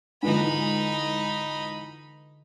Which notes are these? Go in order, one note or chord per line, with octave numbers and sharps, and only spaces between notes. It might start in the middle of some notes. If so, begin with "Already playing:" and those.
G#2 D3 E3 F3 D#4 B4 B5 E7